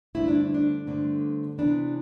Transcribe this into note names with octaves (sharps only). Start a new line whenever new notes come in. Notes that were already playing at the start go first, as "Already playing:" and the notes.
G2 D3 A3 C4 E4
D4
D4
G2 D3 A3 C4
C3 E3 B3 D4